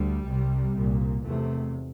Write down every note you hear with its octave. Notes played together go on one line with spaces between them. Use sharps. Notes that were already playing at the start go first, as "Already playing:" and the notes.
Already playing: D2 G3
C2 C3
C2 A#2
F1 E2 C3 A3